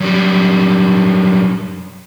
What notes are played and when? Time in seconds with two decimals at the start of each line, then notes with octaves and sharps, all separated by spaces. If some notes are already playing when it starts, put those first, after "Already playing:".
0.01 F#2 G3